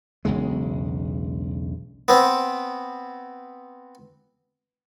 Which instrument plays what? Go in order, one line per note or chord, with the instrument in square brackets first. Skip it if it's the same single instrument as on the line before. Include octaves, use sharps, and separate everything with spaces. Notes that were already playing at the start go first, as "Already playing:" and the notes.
[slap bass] E1 B1 C#3 G#3
[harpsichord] B3 C4